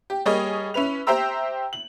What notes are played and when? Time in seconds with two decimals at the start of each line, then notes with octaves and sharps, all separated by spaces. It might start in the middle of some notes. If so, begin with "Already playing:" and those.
0.10 G4
0.26 G3 A#3 G#4 C#5 D#5
0.74 C#4 E4 B4 F7
1.07 G4 C5 E5 G5 A#5 E6
1.73 F#7